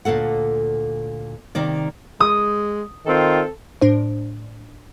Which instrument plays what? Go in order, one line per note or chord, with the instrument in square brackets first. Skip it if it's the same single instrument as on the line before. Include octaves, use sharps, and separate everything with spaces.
[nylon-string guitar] D2 A#2 A#3 A4 F#5
C3 D#3 A#3 D5
[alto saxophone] G#3 [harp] D#6
[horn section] D#3 C4 F4 [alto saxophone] A4
[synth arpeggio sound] A2 D4 C5